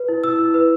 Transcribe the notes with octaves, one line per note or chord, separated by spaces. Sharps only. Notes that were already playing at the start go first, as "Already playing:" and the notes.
Already playing: B4
E4
E4 E6
E4
B4